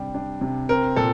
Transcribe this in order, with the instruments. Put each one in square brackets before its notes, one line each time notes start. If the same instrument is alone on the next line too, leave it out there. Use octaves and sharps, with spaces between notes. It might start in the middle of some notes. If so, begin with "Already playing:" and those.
Already playing: [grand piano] C3 G3 D4 G4
D4
C3
[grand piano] C4 [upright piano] A#4
[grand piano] A#2 [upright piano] A4